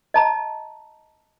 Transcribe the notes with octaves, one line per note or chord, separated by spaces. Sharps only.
D#5 A5 A#5